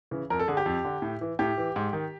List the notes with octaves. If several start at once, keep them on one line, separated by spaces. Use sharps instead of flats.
C#3 E3
F2 A#4
A4
D3 G#4
G4
F2
D3
A2
E3
A2 G4
E3
G#2
D#3